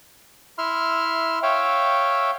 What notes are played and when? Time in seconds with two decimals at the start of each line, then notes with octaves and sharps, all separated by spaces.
0.58 E4 E5 C6 F6
1.43 C#5 E5 F5 G5